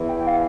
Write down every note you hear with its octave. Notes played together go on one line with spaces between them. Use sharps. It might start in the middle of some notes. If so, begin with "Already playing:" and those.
Already playing: E2 E3
G5
G5
F5